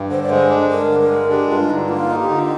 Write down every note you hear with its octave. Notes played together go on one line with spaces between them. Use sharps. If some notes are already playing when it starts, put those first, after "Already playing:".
Already playing: G2
D3 C5
D5
G#3 C5
D4
G2 A#4
D3
A#4
G#3
D4 G4
G2 F4
D3 D#4
A#3 F4
D#4
G4
D3